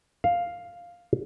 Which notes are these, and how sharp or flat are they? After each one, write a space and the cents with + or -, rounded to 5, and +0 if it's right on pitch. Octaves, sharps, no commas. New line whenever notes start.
F5 +5